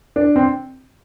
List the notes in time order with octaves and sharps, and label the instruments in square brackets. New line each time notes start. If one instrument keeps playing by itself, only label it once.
[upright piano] D4
C4